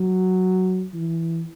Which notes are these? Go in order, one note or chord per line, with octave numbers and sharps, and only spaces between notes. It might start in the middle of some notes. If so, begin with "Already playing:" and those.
Already playing: F#3
E3